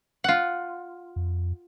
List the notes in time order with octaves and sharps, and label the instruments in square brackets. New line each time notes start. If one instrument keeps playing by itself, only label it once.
[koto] F4 F#5
[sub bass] F2